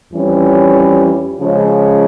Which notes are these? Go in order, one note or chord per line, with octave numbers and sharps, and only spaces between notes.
F2 E3 G3 C#4
C#3 F3 G#3 C#4